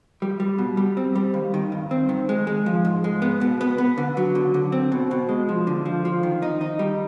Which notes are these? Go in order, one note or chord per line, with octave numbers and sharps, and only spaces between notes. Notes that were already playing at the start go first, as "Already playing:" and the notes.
G3
G3
B2
G3
C4
G3
D#2
D#3
G2
C4
D#3
G#3
G#3
F3
G#2
G#3
B3
B2
B3
B3
D3
F#3
D3
D3
C4
B2
B2
G#3
F3
D3
F3
F3
D#3
D#4
D#4
G3